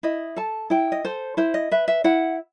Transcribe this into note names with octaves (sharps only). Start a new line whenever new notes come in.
E4 D#5
A4 A5
E4 G5
D#5
A4 C5
E4 C5
D#5
B4 E5
E5
E4 F#5